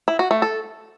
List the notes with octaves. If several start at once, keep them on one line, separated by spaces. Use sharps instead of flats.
E4
F#4
A3
A4